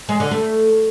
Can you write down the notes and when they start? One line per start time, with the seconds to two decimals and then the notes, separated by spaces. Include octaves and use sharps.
0.09 G#3
0.20 D3
0.31 A3